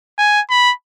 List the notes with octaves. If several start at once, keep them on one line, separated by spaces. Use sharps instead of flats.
G#5
B5